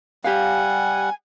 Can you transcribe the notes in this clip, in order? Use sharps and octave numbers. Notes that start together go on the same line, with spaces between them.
G3 G4 F5 F#5 G#5